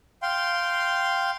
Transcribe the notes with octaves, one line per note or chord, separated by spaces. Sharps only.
F5 G5 C6